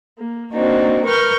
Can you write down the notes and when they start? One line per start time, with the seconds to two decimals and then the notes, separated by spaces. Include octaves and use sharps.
0.18 A#3
0.52 A#3 C4 D4 D#4 F#4
1.04 A#4 B4 C#6 F6 G6